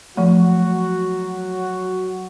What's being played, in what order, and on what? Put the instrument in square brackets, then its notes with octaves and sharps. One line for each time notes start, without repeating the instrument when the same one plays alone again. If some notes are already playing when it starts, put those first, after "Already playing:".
[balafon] F3 A3 [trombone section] F#3 F#4